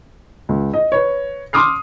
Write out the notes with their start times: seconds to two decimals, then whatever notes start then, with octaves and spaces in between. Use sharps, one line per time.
0.49 C#2
0.74 D#5
0.92 B4 C#5
1.53 C6 D6 D#6 F6 C7